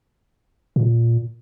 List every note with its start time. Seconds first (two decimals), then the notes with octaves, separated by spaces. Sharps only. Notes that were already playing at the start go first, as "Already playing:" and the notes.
0.76 A#2